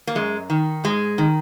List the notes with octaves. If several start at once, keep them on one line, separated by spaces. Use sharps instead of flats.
A#3
F#2 G#3
D#3
G#2 G#3
D#3